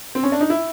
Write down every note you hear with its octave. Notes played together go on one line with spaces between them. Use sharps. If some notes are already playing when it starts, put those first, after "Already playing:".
C4
C#4
D4
D#4
E4